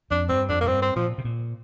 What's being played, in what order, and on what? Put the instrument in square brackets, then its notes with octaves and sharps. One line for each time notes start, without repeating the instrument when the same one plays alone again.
[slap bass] F2 [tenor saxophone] D4
[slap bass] G2 [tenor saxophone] C4
[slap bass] F2 [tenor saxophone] D4
[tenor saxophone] A#3
[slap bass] A#2
[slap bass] G2 [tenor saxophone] C4
[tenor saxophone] C4
[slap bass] A#2 [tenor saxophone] F3
[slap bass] C3
A#2